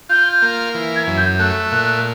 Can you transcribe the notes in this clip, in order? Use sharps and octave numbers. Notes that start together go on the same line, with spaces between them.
F4 G6
A#3
E3
G#6
F#2
G6
A3 F#6
A#2